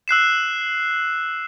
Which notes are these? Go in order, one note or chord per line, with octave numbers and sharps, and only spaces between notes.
E6 F#6 C7 E7